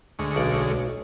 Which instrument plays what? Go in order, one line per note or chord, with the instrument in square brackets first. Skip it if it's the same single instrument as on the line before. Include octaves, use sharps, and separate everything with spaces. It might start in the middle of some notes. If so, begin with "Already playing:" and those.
[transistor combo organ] D2 G#3 C#6
[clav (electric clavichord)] B1 D5